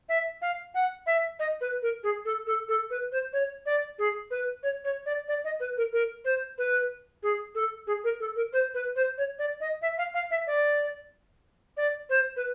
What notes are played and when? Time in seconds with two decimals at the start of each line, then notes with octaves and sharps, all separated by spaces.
0.09 E5
0.42 F5
0.74 F#5
1.06 E5
1.39 D#5
1.61 B4
1.82 A#4
2.03 G#4
2.25 A4
2.47 A4
2.68 A4
2.90 B4
3.12 C5
3.33 C#5
3.66 D5
3.99 G#4
4.31 B4
4.63 C#5
4.84 C#5
5.06 D5
5.28 D5
5.44 D#5
5.60 B4
5.77 A#4
5.93 A#4
6.25 C5
6.58 B4
7.23 G#4
7.55 A4
7.87 G#4
8.04 A#4
8.20 A4
8.36 A#4
8.53 C5
8.74 B4
8.96 C5
9.18 C#5
9.39 D5
9.60 D#5
9.82 E5
9.98 F5
10.14 F5
10.31 E5
10.47 D5
11.77 D5
12.09 C5
12.36 B4